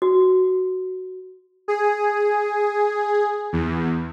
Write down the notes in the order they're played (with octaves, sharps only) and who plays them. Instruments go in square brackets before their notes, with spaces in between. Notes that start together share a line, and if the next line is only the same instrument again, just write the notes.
[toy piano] F#4
[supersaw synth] G#4
E2